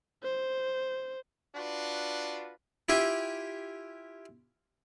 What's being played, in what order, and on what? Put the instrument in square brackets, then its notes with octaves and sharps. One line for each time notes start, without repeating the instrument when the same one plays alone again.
[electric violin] C5
[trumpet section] D4 F4 F#4 B4
[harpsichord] E4 F4 G4 E5 G#5